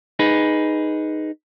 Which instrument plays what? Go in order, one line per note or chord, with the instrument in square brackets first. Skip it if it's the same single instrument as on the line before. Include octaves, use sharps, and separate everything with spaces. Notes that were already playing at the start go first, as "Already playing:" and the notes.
[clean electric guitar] D#4 G#4 B4